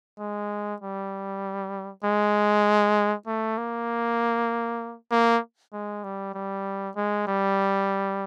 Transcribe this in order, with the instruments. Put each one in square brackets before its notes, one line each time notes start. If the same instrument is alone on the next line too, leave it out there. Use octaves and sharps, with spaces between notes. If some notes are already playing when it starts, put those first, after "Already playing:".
[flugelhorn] G#3
G3
G#3
A3
A#3
A#3
G#3
G3
G3
G#3
G3